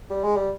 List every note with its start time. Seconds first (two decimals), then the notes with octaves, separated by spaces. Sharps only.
0.10 G3
0.24 G#3
0.36 G3